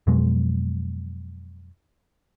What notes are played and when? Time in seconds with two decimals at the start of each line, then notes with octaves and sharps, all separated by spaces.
0.07 F2 B2 F#3 G#3